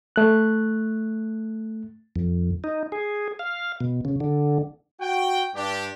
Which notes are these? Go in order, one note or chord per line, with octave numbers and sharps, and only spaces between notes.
A3 F#6
F2
D#4
G#4
F5
B2
C#3
D3
F#4 G5
G2 D4 G4